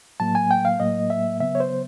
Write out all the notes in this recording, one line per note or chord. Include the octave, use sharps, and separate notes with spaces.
A2 F#3 A#3 A5
G#5
G5
F5
A2 F#3 A#3 D#5
E5
C#3 F#3 B3 E5
C#5
C5